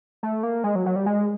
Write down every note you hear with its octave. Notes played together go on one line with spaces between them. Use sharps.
A3
A#3
G#3
F#3
F#3
G3
G#3